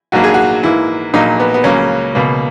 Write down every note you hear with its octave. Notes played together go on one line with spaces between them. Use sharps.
A#1 G#2 F#3 A#3 F#4
G#4
F#4
G#2 E3 A#3 E4
A#1 A#2 F#3 A#3 D#4
B3
B3
C#2 C#3 F#3 A#3 C#4
C#2 B2 A#3